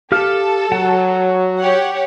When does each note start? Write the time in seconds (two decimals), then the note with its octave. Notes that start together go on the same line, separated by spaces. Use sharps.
0.12 G4 A4 F5 F6
0.72 F#3 F#5 A5
1.59 G4 C#5 F#5